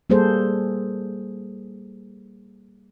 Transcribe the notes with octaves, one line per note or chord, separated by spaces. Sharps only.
G3 A#3 G#4 A4 C5